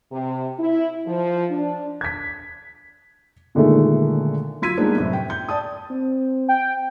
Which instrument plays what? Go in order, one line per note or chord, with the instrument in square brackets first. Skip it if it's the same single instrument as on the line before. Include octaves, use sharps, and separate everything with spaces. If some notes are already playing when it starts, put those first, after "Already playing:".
[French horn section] C3
E4
F3
D4
[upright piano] G#6 B6
A#2 D3 D#3 G#3 A3
[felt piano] F#3 F4 E6 G#6 B6 D#7
G3 G#3 A#3 B3 D4 D#4
F#2 A2 C3
G5
G6
D5 A5 D#6
[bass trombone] C4
[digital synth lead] G5